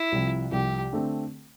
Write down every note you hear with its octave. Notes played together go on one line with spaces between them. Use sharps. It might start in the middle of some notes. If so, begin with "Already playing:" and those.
Already playing: E4
C2 C3 F3
C2 C3 F3 G4
D3 A3 C4